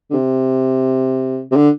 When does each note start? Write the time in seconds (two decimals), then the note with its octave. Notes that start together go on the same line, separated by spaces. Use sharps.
0.10 D3
0.14 C3
1.52 C3
1.56 D3